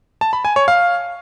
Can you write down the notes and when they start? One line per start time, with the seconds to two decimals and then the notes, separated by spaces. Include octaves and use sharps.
0.21 A5
0.33 B5
0.45 G#5
0.56 C#5
0.68 F5